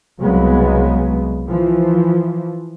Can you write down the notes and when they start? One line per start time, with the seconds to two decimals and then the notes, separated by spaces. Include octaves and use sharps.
0.20 C2 C#3 F#3 G#3 B3
1.47 E3 F3